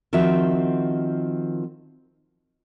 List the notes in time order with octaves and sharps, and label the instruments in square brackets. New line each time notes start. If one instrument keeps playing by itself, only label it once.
[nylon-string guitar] D#3 F3 C4 F#4 E5